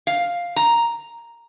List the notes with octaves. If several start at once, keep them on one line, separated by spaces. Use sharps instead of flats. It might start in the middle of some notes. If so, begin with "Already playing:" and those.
F5
A#5